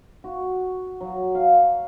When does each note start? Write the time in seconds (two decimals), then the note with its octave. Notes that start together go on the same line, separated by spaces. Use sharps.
0.24 F#4
1.01 F#3
1.35 F5